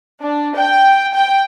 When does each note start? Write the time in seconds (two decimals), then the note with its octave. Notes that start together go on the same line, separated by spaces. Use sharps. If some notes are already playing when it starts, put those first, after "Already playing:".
0.21 D4
0.57 G5
1.14 G5